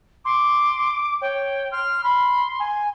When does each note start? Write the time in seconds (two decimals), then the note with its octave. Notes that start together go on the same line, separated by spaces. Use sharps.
0.25 C6 D6
1.21 C#5 G5
1.72 C6 F6
2.04 B5 C6
2.60 G#5